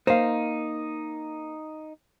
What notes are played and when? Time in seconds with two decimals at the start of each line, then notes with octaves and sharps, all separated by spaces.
0.07 A#3 D#4 C5 F5